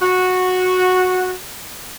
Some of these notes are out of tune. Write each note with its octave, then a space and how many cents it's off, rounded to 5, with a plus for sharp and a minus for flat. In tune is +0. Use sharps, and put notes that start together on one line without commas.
F#4 -10